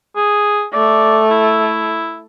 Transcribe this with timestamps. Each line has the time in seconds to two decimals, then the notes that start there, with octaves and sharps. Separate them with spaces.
0.16 G#4
0.74 A3 D5
1.31 E4